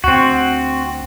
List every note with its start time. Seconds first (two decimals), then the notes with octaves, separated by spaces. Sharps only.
0.04 D2 C4 F#4